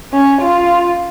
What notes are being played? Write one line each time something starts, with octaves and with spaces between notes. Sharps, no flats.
C#4
F4